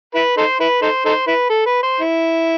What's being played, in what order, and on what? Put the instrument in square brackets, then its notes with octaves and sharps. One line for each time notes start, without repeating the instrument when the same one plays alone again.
[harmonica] E4 B4
D#4 A4 C5
E4 B4
D#4 A4 C5
D#4 A4 C5
E4 B4
A4
B4
C5
E4